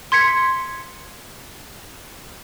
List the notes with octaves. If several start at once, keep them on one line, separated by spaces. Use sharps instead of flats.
C6 G#6 B6 C#7